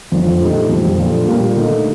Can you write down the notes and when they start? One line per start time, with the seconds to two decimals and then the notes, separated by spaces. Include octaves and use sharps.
0.12 F2 D3 F3
0.41 A#2 A3 D#4 G4
0.69 F2 D3 G3
0.98 A#2 F3 A3 D4 F4
1.26 A#2 G3 A#3
1.55 D3 A3 D#4